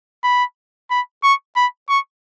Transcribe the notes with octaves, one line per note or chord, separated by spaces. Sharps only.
B5
B5
C#6
B5
C#6